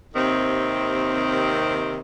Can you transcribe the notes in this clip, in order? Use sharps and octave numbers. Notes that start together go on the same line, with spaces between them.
D#2 C3 D#3 C4